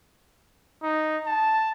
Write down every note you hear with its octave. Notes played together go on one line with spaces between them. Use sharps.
D#4
A5